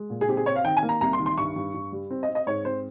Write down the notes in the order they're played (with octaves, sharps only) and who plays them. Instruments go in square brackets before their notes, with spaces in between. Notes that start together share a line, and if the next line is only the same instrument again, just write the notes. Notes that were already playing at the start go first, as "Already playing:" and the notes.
Already playing: [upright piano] G#3
A#2
G#4
C4 G4
G#4
C4 C#5
F5
D#3 G5
G#5
A#3
A#5
C2 A#5
C6
D#3
C6
G2 C#6
G2
G2
G3
C4
D#5
C4
D#5
G#2 C#5
C4 C5